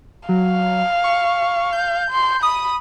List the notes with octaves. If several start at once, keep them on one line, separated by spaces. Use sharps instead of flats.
F#3 F5
C#6
G6
C6
B5 D#6